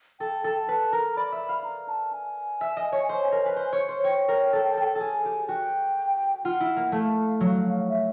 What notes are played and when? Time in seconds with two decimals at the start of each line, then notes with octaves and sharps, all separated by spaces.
0.20 A4 G5
0.44 A4
0.69 B4 A5
0.93 A#4 A#5
1.16 D5 B5
1.32 E5
1.49 F5
1.64 A#5
1.89 A5
2.13 G#5
2.61 E5
2.77 D#5
2.92 C#5
3.09 C5
3.32 A#4
3.46 B4
3.56 C5
3.73 C#5
3.89 C5
4.04 C#5 G5
4.28 A#4
4.53 A4
4.77 A4
4.95 A4
5.00 G#4 G#5
5.25 G4
5.48 F#4 G5
6.44 F4 F#5
6.61 E4
6.77 A#3
6.92 A3 F5
7.41 F#3
7.89 E5